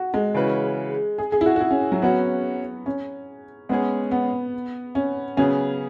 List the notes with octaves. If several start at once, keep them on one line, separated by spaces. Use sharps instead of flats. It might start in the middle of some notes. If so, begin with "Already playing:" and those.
Already playing: F#4
G#3
C#3 E3 C#4 F#4 B4
G#4
G#4
E4
F#4
F#4
E4
C#4
F#3
F#3 B3 C#4 F#4
C#4
G#3 B3 C#4 G#4
B3
C#4
C#3 F#3 B3 C#4 G#4